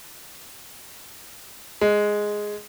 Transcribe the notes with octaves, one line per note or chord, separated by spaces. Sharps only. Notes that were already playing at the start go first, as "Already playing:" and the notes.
G#3